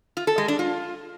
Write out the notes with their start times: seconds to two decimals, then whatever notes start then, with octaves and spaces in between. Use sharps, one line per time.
0.17 F4
0.27 A4
0.38 G#3
0.48 D4
0.59 F4